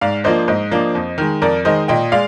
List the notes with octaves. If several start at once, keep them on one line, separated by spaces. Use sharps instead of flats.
G#2 D5 F5
F3 A#3 D4 C5 D#5
G#2 C5 D#5
F3 A#3 D4
F2
D#3 G#3
F2 A#4 D5
D#3 G#3 C5 D#5
A#2 D#5 G5
G#3 D5 F5